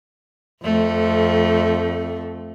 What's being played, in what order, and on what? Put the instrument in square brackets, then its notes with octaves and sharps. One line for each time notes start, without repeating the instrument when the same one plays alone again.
[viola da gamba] F2 A3